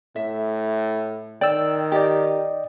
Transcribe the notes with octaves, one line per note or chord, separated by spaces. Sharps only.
A2 E5
D#3 D5 G5 E6
G4 D5 D#5 G5